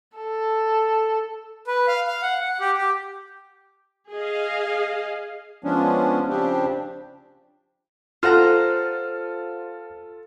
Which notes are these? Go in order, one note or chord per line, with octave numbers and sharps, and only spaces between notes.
A4
B4
F5
F5
F#5
F#5
G4
G4
G#4 D#5 F5
F3 G#3 B3 C#4 D4
C#3 F3 C4 D4 G4
F4 A4 C5 F#5 A#5 F6